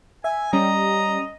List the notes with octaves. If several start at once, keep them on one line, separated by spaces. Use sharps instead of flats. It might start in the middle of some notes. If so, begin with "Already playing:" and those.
E5 G#5
G3 C#4 D#5 A#5